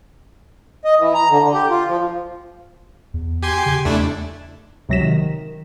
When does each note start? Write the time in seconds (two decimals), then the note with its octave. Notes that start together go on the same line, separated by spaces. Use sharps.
0.85 D#5
1.00 E3
1.15 A#5
1.30 D3
1.42 D3
1.54 G4
1.70 F4
1.88 F3
3.14 E2
3.43 G4 G#5 C6
3.66 C#3
3.85 E2 A3 D4 E4
4.89 C#2 C3 F#3 A#6 B6 E7
5.01 D#3